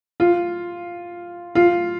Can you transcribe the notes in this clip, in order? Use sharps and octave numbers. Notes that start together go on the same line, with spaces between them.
F4
F4